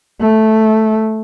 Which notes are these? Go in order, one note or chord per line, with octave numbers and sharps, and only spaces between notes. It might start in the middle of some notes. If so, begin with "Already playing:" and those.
A3